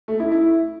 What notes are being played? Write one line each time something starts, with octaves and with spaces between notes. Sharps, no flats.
A3
E4
E4